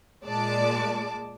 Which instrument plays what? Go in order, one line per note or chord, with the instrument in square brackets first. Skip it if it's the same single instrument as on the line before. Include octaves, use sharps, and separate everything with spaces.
[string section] A#2 G#3 D5 A5 D6